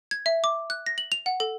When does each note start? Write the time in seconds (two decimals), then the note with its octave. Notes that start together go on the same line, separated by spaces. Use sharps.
0.11 G#6
0.26 E5
0.44 D6
0.70 F#6
0.86 A#6
0.98 F#7
1.12 F7
1.26 F#5
1.40 A4